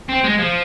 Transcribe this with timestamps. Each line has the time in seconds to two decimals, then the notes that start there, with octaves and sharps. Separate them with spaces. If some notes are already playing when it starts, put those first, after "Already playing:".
0.09 C4
0.24 G#3
0.38 F3